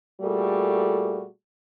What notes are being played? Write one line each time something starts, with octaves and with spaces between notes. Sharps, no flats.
A#2 G3 A3 F#4 G#4 A4